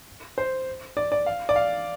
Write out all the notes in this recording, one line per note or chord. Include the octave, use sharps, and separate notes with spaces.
C5
D5
D5
F5
D5
F5